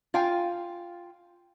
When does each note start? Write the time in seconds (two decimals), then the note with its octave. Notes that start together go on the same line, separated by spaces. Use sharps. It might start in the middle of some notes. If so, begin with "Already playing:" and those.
0.14 F4 F5 G5 G#5